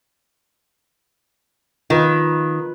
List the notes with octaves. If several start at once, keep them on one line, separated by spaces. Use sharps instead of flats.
D#3 F4 B4